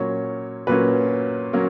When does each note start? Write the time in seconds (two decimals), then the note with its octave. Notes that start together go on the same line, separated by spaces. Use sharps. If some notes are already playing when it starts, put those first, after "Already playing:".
Already playing: A#2 F#3 A#3 C#4 C#5
0.67 A#2 F#3 A#3 C#4 B4
1.53 F#3 A#3 C#4